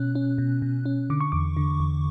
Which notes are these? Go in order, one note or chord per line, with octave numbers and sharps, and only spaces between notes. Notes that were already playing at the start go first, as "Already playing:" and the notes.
Already playing: B2 C#4 F#6
C#4
B2
B2
C#4
D3 D6
C#6
E2 D6
D3
E2